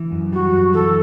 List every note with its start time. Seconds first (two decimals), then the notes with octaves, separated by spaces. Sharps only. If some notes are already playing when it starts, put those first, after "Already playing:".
Already playing: E3
0.12 F#2
0.32 G3 F#4
0.53 F#2
0.73 E3 A4